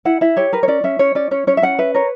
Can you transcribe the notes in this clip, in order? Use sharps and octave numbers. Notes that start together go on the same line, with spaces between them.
E4 F#5
E4 E5
G4 C#5
A#4 B4
C#5
C#4 D5
C#4 E5
C#4 C#5
C#4 D5
C#4 C#5
C#4 C#5
E5
C#4 F#5
B4 E5
A#4 C#5